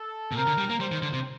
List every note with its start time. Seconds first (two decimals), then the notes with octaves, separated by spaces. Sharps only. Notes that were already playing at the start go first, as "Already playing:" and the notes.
Already playing: A4
0.32 A#2
0.36 C3 A#4
0.47 D3
0.58 G3
0.70 A#3
0.80 G3 C5
0.92 D#3
1.02 D3
1.13 C3